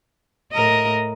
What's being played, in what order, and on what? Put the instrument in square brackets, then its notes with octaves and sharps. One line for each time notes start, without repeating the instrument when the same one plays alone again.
[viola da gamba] A2 A#4 D#5